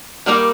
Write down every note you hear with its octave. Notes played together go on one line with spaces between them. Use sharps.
D#3 G3 A#3 D#4 A#4